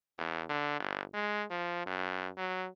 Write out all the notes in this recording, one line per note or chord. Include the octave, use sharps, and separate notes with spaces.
E2
D3
G1
G#3
F3
F#2
F#3